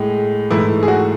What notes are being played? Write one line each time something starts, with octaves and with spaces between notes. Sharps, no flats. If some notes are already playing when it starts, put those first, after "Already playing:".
Already playing: A2 G#3
G#2 E3 A3 E4
G#4
F#4